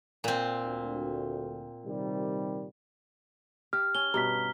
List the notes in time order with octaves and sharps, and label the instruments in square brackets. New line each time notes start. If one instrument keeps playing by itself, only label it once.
[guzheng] A#2 C4
[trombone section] D2
C3 D#3 G3
[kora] G4 [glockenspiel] F6
[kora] C#4 [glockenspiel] G7
[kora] G2 B2 [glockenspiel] A#5 B6